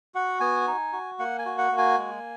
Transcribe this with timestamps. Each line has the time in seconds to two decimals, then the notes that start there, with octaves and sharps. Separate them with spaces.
0.15 F#4 F#5
0.40 B3 G#5
0.67 D#4
0.93 F#4
1.19 A#3 F#5
1.39 G#5
1.46 F#4
1.58 F#5
1.72 A#3
1.78 G#5
1.98 G#3